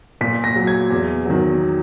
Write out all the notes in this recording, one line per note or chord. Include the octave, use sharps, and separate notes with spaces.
A#2 B6
A#6
F#3
G#6
E2
D#3 F#3